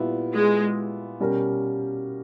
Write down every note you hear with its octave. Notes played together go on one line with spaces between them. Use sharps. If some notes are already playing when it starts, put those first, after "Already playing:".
Already playing: A#2 G3 B3 E4
G#3
B2 G3 C#4 G4 A#4